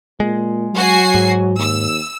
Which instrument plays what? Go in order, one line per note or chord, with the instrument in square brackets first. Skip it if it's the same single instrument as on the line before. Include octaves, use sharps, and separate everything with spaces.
[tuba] A#2 [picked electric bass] G#3
[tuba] F#3 [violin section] F#4 G#5 C7
[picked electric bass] G#2
[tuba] D#2 [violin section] E6